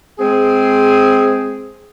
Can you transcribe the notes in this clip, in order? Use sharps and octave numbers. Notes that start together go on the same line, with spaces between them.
G#3 C4 G#4